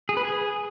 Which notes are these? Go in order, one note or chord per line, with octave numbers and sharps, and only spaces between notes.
G#4
B4
G#4